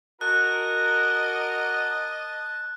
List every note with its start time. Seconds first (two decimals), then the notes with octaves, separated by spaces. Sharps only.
0.21 F#4 A#4 D#5 A5 F#6